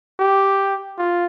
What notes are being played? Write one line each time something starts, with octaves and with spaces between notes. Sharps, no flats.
G4
F4